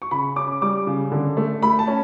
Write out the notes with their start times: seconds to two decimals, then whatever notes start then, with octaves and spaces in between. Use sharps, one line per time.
0.02 C#6
0.11 C#3 B5
0.36 C#4 D6
0.62 G3 D6
0.87 C#3
1.12 D3
1.37 A3
1.62 A3 B5
1.79 A5
1.87 C#4